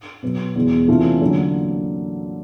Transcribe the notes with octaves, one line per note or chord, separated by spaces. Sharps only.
B2 F#3 B3
E2 B2 G#3
C3 E3 A3 C#4 F4
D3 F#3 A#3